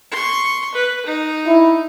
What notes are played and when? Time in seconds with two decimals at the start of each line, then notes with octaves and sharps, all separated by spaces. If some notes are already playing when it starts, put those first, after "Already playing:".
0.11 C6 C#6
0.75 B4
1.06 D#4
1.47 E4